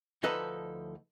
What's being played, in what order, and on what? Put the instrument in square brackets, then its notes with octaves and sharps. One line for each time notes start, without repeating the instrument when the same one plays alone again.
[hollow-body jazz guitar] D2 F3 D#4 A4 B4 D#5